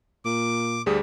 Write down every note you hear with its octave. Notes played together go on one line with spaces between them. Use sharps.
A#2 D6
D2 G3 G#4 D#6